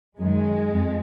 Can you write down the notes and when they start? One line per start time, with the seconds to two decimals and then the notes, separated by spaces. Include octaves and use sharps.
0.18 F#2 D#3 G#3
0.72 F2